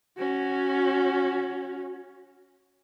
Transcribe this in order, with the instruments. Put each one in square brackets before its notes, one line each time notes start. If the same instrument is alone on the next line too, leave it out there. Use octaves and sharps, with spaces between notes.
[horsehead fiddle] C#4 F#4